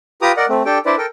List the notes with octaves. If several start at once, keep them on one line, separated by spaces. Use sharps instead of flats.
F4 G4 B4 A#5 D6 D#6
A#4 D5 D#5 F#5
A3 C4
D4 G4 A4 G5
D4 E4 B4 C5 D5
A4 A#4 G5